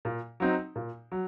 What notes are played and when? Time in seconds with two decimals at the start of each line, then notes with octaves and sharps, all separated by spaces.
0.05 A#2
0.40 F#3 C4 D#4
0.76 A#2
1.12 F#3